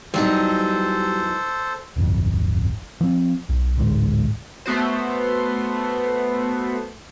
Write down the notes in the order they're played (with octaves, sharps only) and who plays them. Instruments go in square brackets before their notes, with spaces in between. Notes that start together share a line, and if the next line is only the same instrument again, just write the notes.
[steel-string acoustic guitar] E2 F#3 D#4 [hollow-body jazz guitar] G3 [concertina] A4 C5
[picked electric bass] D1 G1 F2
F3 C4
B1
A1 D2 G#2 G#3
[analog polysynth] A3 B3 F#4 C5